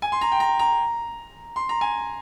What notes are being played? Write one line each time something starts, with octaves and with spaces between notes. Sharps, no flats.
G#5
C6
A#5
G5
A#5
A#5
C6
A#5
G#5